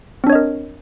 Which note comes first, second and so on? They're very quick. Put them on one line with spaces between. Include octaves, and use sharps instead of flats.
C4 D4 C#5 D#5 A#4